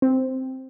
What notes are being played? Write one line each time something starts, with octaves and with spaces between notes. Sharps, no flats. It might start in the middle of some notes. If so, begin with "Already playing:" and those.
C4